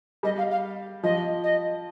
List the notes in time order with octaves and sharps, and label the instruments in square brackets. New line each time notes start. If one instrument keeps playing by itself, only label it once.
[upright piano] G3 [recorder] D#5
[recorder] F5
F5
[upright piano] F3 [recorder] D#5
[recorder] D#5